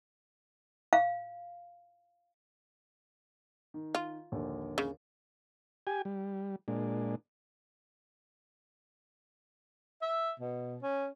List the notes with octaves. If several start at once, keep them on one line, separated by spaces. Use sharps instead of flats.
F5
D#3
F4
A#1 D#2 D3
C#3
G4 G#5
G3
A#2 G#3 D4
E5
B2
C#4